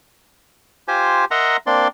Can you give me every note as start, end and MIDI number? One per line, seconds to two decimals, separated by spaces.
0.88 1.25 65
0.88 1.25 67
0.88 1.25 72
0.88 1.25 80
1.31 1.57 70
1.31 1.57 75
1.31 1.57 76
1.31 1.57 78
1.31 1.57 82
1.31 1.57 84
1.67 1.88 58
1.67 1.88 60
1.67 1.88 62
1.67 1.88 74
1.67 1.88 84